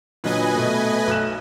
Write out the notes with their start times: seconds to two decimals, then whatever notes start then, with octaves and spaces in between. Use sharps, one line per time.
0.24 A#2 D3 F#3 B4 D#5 G#5
0.55 B2 A3
1.07 B1 F#6 E7